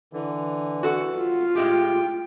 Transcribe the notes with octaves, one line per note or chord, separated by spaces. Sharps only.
D3 E3
F#4 A4 F#5
F4
A2 G#3 G4 G5